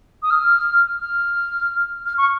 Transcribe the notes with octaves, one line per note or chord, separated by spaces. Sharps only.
D#6
F6
F6
F6
C#6